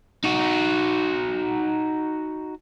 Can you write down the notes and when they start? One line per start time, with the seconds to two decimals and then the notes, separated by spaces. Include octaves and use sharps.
0.24 D#4 F#4